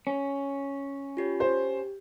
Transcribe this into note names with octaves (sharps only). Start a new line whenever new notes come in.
C#4
F4 G4 C#5
G4 C5